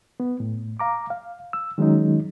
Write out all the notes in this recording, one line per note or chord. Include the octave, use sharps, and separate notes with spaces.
B3
A2
F5 A#5 D6
F5
E6
D#3 F#3 G#3 C#4 D#4